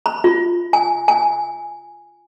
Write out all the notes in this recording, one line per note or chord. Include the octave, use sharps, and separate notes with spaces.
B5
F4
G#5
G#5